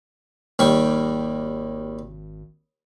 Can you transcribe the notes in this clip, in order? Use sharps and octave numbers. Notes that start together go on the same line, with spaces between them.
G#1 D#2 G3 C#6